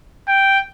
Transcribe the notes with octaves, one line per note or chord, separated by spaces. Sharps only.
G5